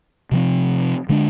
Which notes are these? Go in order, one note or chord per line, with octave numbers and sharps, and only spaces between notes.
C3 F3 C4
D3 G#3 D4